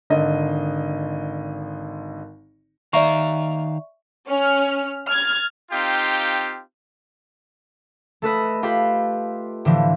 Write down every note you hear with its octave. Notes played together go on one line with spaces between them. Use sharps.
G#1 D3 D#5
D#3 D5 E5 F5 A#5 C#6
C#4 F6
F6 G#6 A6
C4 D#4 F4 G4 F5 G5
A3 A4 B4 D#5
F4 G4 A4 B4
A2 D3 E3 F3